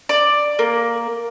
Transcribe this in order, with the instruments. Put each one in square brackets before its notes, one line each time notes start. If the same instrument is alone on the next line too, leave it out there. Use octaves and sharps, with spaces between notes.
[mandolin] D5
A#3